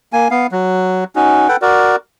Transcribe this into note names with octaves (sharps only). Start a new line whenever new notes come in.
A#3 G#5
B3 F5
F#3
C#4 D#4 F#4
A4 B4 F#5 G5
F#4 A#4 D5